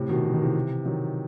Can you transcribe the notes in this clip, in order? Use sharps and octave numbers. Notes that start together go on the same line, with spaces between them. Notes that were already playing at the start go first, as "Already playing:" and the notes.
Already playing: A2 C3
B2 D#3
E3
D#3
C3 E3
D#3 F#3